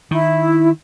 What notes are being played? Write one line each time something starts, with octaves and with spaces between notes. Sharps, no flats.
D#3 E4